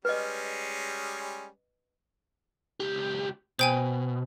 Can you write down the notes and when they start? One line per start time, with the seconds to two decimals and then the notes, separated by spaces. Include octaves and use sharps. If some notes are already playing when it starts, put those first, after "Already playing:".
0.05 G3 G#3 C#4 B4 D#5
2.80 C#2 G4
3.59 B2 C5 G5 G#5